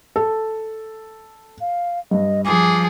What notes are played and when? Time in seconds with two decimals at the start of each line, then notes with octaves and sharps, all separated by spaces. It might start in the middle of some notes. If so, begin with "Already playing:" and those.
0.16 A4
1.61 F5
2.11 G2 D#5
2.45 F3 G#4 D6